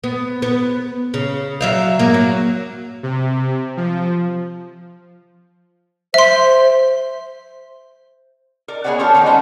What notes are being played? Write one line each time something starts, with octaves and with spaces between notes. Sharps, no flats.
B3
B3
C#3
F#3 E5 F5
G#2 A#3
F#3
C3
F3
C5 E5 C6
A#4 D5
B3 G#4 B4 C#5 D5 F#5
F3 F4 G4 A4 A#4 C#5
D#3 B3 D#4 D5
G3 G#3 C#4 C5 F#5 G5